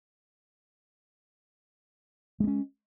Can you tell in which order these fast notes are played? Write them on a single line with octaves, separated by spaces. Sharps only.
G#3 A#3 C#4